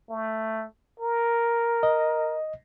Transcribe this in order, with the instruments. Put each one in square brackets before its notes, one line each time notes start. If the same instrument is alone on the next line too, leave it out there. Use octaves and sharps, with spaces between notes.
[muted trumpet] A3
A#4
[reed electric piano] D#5